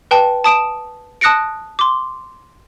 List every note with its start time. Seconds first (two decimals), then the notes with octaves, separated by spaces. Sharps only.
0.11 B4 G5 A5
0.44 A5 D#6 D7 E7
1.21 A5 D#6 F#6 A#6 C#7 D7
1.79 C6 D6